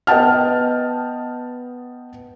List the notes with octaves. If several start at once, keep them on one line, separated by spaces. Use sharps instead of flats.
B3 D#5 G5 A5 F6